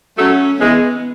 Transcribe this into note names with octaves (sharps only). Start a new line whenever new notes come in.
F#3 A3 C#4
E3 G#3 B3